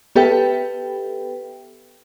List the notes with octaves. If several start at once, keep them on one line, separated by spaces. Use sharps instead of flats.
B3 G4 A4 B4 E5 G5